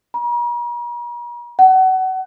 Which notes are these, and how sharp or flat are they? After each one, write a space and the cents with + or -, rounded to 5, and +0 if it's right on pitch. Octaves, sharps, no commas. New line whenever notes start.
A#5 +45
F#5 +25